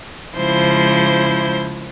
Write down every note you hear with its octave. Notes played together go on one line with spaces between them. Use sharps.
C#3 F3 G#3 E4 C5 G6